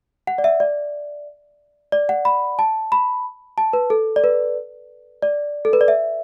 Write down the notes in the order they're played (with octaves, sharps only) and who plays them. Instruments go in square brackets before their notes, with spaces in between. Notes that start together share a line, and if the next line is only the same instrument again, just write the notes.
[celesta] F#5
D5
E5
D5
D5
F#5
B5
A5
B5
A5
B4
A4
D5
B4
D5
A4
B4
D5
E5